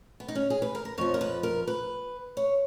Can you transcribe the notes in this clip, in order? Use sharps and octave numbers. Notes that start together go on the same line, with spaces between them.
B3
D#4
C#4
G#4
B4
A#4
A#4
F2 F3 C#5
A#4
B4
A#4
B4
C#5